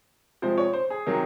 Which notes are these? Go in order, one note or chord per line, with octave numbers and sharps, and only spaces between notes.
C3 F3 G#3 C5
C#5
C5
G#4
C3 D#3 F#3